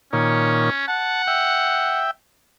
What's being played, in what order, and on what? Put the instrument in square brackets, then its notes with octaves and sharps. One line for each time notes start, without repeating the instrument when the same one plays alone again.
[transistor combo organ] A#2 D#3 C#5 [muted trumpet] C#4
[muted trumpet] F#5 [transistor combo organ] A5
[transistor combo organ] E5 G5